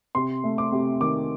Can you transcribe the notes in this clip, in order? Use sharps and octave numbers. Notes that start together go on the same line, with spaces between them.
C3 C6
A3
D6
C3
D#3 D6